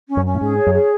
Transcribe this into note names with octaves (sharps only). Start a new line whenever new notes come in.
C#4
F#2
C#4
A2
G#2 G#4
C#5
F#2
G#4